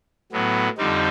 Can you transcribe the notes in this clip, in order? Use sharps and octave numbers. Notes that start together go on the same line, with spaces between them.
A2 F#3 B3
F2 D3 G3 C4 D#4